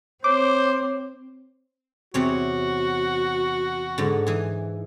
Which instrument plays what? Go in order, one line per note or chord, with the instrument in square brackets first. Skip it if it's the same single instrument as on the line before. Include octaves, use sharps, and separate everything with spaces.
[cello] C4 [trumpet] C5 [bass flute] C#5 [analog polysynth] D6
[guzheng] E2 C3 C#5 [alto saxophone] F#4
[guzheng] G#2 D3
E3 G#4